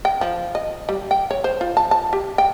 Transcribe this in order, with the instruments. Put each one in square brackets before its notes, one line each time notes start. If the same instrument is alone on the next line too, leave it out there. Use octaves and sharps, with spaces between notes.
[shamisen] G5
F3
D#5
G3
G5
C#5
C5
F4
A5
A5
G4
G5